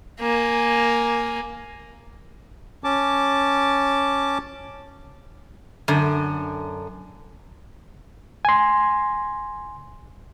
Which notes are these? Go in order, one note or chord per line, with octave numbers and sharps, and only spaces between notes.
A#3 G#5
C#4 A5 D6
F#2 D3
G#5 C6